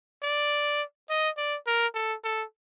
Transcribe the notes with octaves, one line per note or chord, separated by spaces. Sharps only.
D5
D#5
D5
A#4
A4
A4